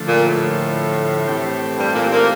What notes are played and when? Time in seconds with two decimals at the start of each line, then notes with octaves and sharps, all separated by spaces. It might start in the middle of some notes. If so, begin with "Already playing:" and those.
Already playing: D3 F3 A3
0.08 A#2
0.25 A2
1.27 E3 A3 C4 G4
1.77 G2 G3
1.94 A#2 A#3
2.11 A#2 A#3